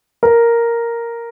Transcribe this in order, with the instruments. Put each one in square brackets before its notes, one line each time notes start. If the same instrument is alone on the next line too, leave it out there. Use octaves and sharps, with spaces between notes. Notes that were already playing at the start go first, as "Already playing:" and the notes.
[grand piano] A#4